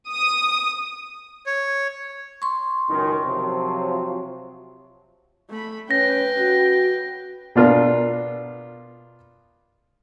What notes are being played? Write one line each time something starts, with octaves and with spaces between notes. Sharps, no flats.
D#6
C#5
C6 C#6
C#2 F#2 D#3
C3 F3 F#3
A3 B5
C#4 B4 G5 A#6
F#4
B2 D4 F4 A#4